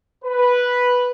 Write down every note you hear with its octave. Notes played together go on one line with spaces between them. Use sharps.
B4